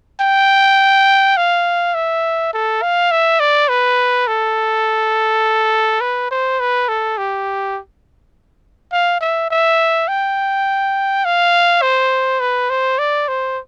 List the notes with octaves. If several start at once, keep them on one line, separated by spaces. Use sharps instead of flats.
G5
F5
E5
A4
F5
E5
D5
B4
A4
B4
C5
B4
A4
G4
F5
E5
E5
G5
F5
C5
B4
C5
D5
C5